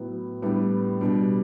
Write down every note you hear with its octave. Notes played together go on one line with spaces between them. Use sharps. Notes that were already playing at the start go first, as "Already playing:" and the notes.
Already playing: A2 F#3 B3
A2 G3 B3 D4
B2 G3 D4